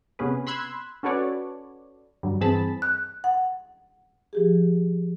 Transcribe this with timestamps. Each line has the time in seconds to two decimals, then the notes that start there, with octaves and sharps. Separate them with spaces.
0.19 C3 B3 C#4 G#4 B4
0.47 B5 C6 E6 F#6 G#6
1.03 C#4 F#4 A4 B4 C#5 D5
2.23 G2 D3 F#3 G3
2.41 G2 E3 C4 G#4 A5 B5
2.82 F#6
3.24 F#5
4.33 F3 G4 G#4